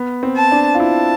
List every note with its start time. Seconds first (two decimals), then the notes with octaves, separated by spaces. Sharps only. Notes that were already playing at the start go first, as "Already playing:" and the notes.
Already playing: B3
0.23 C4
0.37 A5
0.52 D4
0.75 F4
0.80 E4 A5